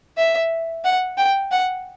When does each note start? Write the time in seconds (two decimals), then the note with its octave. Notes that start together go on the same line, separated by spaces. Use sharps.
0.17 E5
0.84 F#5
1.18 G5
1.51 F#5